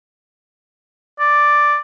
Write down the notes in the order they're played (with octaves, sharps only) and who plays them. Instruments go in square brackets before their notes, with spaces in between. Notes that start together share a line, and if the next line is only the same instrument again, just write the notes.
[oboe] D5